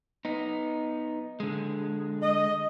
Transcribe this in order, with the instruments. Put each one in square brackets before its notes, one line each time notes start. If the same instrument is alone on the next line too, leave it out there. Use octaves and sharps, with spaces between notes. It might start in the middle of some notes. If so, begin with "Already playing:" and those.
[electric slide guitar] B3 D#4
D3 G#3
[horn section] D#5